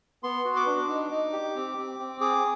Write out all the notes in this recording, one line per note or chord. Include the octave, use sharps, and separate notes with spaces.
B3 C6
F#4
D6
D4
D#4
D#4
G4
C4
C4
C4
G#4 D6